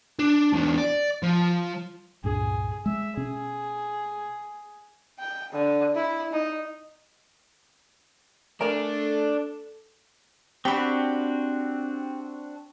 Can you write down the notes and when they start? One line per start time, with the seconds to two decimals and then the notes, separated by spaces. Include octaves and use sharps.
0.19 D4
0.53 E2 D3
0.78 D5
1.23 F3
2.24 C#2 G2 A#2 G#4
2.86 G#3 E5
3.17 B2 C#4 G#4
5.19 G5
5.52 D3
5.95 E4
6.32 D#4
8.61 A3 D4 A4 A#4 G#5
10.65 C4 D4 F#4 G4 B5